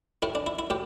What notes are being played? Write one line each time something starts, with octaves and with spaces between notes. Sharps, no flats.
A2 A3 E4
D4
E4
E4
A2 G4